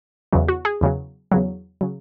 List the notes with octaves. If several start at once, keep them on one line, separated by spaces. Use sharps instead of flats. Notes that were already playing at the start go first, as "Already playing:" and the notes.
E2 C#3 F#3
F#4
G#4
E2 C#3 F#3
E2 C#3 F#3
C#3 F#3